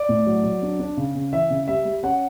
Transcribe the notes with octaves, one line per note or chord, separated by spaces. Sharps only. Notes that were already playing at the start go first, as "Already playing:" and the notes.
Already playing: D5
A2
F#3
F#3
D4
D4
C#3
C#3
E3 E5
C#3
G3 E5
G3
C#4 F#5